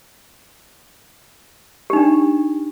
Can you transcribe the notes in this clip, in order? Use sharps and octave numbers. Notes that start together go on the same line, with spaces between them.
D4 D#4 G4